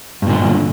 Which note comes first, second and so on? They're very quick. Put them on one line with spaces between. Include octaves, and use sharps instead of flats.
G2 A#2 D3